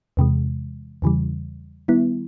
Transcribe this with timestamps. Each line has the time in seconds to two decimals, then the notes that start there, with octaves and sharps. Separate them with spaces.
0.17 E2 C3 E3 G#3
1.02 E2 C#3 E3 G3
1.88 D#3 G3 B3 E4